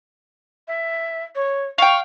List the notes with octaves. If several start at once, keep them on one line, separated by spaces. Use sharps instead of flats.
E5
C#5
F5 G5 C#6